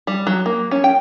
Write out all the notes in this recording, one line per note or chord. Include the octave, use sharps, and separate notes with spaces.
G3
F#3
A#3
C#4
G5